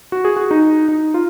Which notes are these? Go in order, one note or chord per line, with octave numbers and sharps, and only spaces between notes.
F#4
G#4
F#4
D#4
D#4
F4